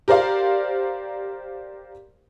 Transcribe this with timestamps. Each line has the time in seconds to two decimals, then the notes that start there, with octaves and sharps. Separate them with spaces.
0.08 G4 A#4 C5 D5 F5